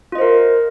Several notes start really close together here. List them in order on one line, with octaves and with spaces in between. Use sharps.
F4 D#5 C5 A#4